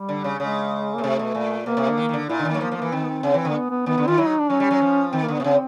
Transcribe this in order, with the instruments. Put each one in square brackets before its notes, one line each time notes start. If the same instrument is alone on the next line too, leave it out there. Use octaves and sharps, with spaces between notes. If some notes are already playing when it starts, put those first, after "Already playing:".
Already playing: [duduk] G3
[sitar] D3
C#3
[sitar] C#3 [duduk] G#3
[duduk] A#3
[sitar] B2
[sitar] C3 [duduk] A3
[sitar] B2
A#2
[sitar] B2 [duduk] A#3
[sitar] C3
D3
D#3
D#3
D3
[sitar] A#2 [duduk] E4
[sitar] D3 [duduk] D#4
[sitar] D#3
[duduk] A#3
[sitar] F#3
[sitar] F3 [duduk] A#3
[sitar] F3
[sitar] E3 [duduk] A#3
[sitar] D#3 [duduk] C4
[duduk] B3
C4
[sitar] C#3
E3
D3
[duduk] A#3
B3
B3
[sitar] D#3 [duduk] B3
[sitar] D3
[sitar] D#3 [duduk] F4
[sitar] F#3 [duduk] E4
[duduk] D#4
D4
[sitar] F#3 [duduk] C#4
[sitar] G3
F#3
F3
[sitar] D#3 [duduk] C4
[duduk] A#3
[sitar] D3 [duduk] B3
[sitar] C3
[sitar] C#3 [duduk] C4